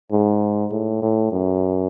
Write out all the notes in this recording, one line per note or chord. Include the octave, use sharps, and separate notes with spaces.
G#2
A2
A2
F#2